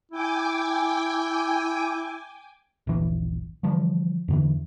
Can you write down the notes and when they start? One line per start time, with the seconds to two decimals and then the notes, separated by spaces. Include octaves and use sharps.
0.12 E4 G5 G#5 D6
2.87 D#1 A#1 E3
3.63 D3 E3 F3 G3
4.28 E2 D3 E3